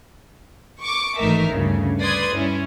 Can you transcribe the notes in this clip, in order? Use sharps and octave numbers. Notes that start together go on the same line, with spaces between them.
C#6 D6
G#1 E3 A3 D#4 A#4 E5
D2 G2 C#3
B4 D5 C6 D#6 G#6
G2 C#4 E4